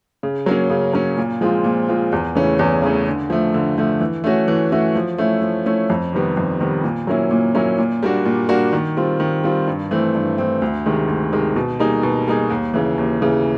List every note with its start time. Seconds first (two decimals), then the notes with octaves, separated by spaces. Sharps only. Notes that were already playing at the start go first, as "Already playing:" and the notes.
0.23 C#3
0.46 F#3 A#3 C#4
0.70 C#3
0.93 F#3 A#3 C#4
1.17 A#2
1.41 F3 G#3 C4 F4
1.64 A#2
1.88 F3 G#3 C4 F4
2.12 E2
2.35 C#3 E3 A3 C#4
2.59 E2
2.82 C#3 E3 A3 C#4
3.06 D3
3.30 F3 A3
3.54 D3
3.78 F3 A3
4.01 E3
4.24 A3 C#4 F#4
4.48 E3
4.72 A3 C#4 F#4
4.95 F3
5.18 A3 C#4 E4
5.42 F3
5.66 A3 C#4 E4
5.90 F2
6.13 C3 D#3 G3 B3
6.37 F2
6.60 C3 D#3 G3 B3
6.84 A#2
7.07 F#3 A#3 C#4 E4
7.31 A#2
7.55 F#3 A#3 C#4 E4
7.78 A#2
8.03 G3 A#3 D4 F#4
8.25 A#2
8.49 G3 A#3 D4 F#4
8.73 D#3
8.97 G3 C4 F4
9.20 D#3
9.44 G3 C4 F4
9.68 G2
9.91 E3 A3 C4
10.15 G2
10.38 E3 A3 C4
10.62 D2
10.86 C3 D#3 G#3
11.08 D2
11.33 C3 D#3 G#3
11.56 B2
11.80 G3 A#3 D#4 G#4
12.03 B2
12.27 G3 A#3 D#4 G#4
12.50 D#2
12.74 C#3 E3
12.98 D#2
13.22 C#3 E3